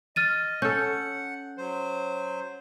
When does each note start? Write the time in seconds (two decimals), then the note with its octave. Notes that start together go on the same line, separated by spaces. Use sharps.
0.16 D#5 F6 A6 D#7
0.62 C#4 A4 F#5 G6
1.58 F#3 C5